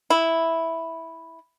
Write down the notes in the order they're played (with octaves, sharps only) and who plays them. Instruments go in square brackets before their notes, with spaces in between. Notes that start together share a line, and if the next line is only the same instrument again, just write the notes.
[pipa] E4